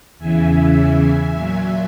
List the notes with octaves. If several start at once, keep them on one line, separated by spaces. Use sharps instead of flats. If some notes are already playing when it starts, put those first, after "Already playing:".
E2 C#3 E3 E5 G#5
A#2 F#3